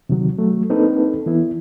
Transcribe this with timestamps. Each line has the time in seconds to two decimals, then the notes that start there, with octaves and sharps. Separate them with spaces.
0.09 C3 D#3 F#3
0.38 F#3 A3
0.70 A#3 C4 D4 D#4 A4 B4
1.26 E3 B3 E4